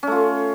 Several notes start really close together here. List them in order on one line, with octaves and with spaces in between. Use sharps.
C#4 A3 F4